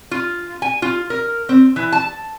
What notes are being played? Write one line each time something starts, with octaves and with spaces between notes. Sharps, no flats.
F4
G#5
F4
A#4
C4
E3
A5